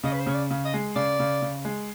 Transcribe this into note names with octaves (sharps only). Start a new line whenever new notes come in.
C#3 D#5
B4
C5
C#3 C#5
D5
C#3
D#5
G#3
C#3 D5
C#3
C#3
G#3